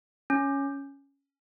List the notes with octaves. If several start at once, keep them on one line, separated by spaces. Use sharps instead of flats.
C#4